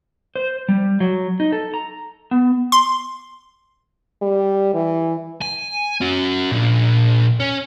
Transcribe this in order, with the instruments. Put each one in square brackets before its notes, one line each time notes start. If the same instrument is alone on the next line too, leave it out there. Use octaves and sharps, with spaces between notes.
[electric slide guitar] C5
G3
F#3
D#4
A4
A#5
B3
[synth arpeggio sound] C6
[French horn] G3
E3
[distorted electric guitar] G#5
C#4 F#4
A#2 D4
C#4